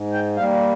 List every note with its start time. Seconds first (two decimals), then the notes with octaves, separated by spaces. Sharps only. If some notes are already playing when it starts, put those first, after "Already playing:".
Already playing: G#2
0.13 G5
0.37 G3 A#3 F5